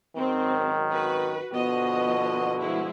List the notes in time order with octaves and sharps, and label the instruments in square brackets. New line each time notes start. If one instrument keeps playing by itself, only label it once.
[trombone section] G#1 F#2 D#3 [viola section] C4
[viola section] F#4 B4
[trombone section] B2 D3 F#4 [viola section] F3 B3 D#5
[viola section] F3 G#3 E4